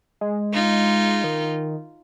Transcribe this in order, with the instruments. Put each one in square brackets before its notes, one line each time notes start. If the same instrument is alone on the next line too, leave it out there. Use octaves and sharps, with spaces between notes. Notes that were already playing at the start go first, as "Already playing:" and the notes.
[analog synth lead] G#3
[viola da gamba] D#4 F4
[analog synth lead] D#3